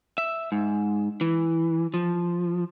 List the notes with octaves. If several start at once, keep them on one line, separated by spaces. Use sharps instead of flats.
E5
G#2
E3
F3